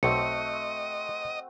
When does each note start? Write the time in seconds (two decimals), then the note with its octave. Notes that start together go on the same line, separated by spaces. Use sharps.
0.03 B1 A3 C4 F#4 D#5 C#7